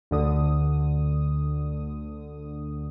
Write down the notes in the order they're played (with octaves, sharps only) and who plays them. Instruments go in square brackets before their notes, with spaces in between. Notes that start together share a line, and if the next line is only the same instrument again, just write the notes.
[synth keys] D2 D3 D#6